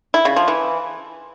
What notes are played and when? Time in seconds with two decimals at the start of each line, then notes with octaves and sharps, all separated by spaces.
0.14 E4
0.25 C#3
0.36 F3
0.48 E3